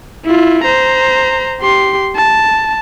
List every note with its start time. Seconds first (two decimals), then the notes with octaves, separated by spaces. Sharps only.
0.25 E4 F4
0.63 C5 A#5
1.61 G4 C6
2.16 A5